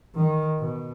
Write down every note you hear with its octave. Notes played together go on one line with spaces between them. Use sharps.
D#3
B2